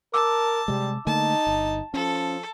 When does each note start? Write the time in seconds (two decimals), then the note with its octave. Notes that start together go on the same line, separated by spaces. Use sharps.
0.14 A#4 A5 D6 E6
0.68 C3 G3 G#3
1.07 D3 A3 A#3 D#4 A5
1.47 G1
1.94 F3 C#4 A4